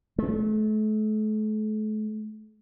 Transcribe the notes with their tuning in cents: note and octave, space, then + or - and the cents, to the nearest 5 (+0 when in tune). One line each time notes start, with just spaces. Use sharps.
A3 -40